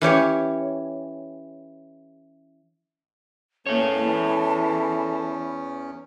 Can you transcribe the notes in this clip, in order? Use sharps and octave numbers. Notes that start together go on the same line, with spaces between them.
E3 C#4 G4 C#5
E2 A#3 C#4 A4 C#5 A5
E3